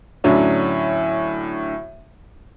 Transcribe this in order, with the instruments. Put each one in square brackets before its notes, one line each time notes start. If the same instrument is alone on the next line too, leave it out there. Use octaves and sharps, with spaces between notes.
[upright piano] A2 D3 F#3 C#4 D4